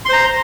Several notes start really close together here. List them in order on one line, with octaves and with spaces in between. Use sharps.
C6 C5 A#5